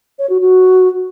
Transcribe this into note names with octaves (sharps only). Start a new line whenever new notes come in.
C#5
F#4
F#4